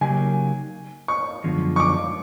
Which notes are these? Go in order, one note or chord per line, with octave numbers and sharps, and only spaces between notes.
C#3 F#3 A#3 D#4 G4 G#5
C#6
F#2 D3 F3 G#3 B3
C#6
D6